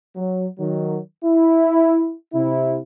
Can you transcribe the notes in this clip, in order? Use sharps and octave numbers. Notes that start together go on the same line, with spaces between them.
F#3
D#3 F#3
E4
C3 E4